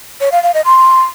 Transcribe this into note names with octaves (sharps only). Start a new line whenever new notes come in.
C#5
F5
F5
D#5
C6